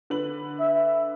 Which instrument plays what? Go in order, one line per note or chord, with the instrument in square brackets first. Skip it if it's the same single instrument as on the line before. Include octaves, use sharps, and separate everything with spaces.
[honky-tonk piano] D3 B4 F#7
[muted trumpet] E5